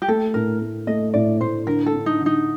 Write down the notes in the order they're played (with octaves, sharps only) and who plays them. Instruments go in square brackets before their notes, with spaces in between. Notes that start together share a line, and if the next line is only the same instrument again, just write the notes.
[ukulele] G4
[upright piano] A3 [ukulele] A4
[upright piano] A2 [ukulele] A#4
[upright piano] A3
[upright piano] A3 [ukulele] D#5
[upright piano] A2 [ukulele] D5
[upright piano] A2 [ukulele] C5
[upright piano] D3 [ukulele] A#4
[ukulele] A4
[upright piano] D4
[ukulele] D#4
[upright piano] D3
[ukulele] D#4